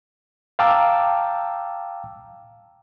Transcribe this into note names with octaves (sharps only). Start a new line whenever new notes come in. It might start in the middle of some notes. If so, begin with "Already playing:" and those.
F5 G5 A5 A#5 D6 E6